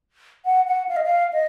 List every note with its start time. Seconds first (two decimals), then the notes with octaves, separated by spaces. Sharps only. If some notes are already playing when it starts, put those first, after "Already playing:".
0.45 F#5
0.67 F#5
0.89 F5
0.96 D#5
1.03 F5
1.33 D#5